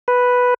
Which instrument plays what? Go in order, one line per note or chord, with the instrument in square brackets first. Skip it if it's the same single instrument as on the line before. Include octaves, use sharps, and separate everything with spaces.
[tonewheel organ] B4